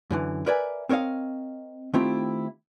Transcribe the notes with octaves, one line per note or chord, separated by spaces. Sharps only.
F#2 D3 E3
A#4 B4 D5 E5 G#5
C4 A#4 C#5 D#5 F5
D#3 A3 C4 E4 F4 G4